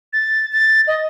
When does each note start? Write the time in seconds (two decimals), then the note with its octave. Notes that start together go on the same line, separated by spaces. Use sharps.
0.13 A6
0.52 A6
0.88 D#5